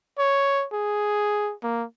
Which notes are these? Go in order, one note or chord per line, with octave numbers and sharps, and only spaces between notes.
C#5
G#4
A#3